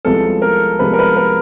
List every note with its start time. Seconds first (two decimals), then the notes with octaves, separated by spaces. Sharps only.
0.05 C2 C3 F3 G#3 B3 A4
0.42 A#4
0.79 C2 C3 F3 G#3 B3 B4
0.93 A#4
0.99 B4
1.17 A#4